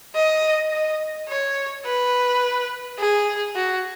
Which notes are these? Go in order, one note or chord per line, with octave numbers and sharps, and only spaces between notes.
D#5
D#5
C#5
B4
G#4
F#4